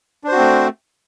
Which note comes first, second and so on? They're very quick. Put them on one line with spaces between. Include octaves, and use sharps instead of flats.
D4 C5 F#4 C4 A3